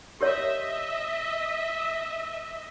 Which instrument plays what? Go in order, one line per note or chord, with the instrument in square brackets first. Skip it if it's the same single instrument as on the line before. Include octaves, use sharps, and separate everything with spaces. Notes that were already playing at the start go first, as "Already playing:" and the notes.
[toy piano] G4 A#4 C#5 [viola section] D#5 E5